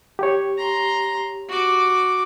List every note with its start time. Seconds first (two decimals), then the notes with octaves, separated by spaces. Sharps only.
0.19 G4 C#5
0.58 A#5 C6
1.49 F#4 D6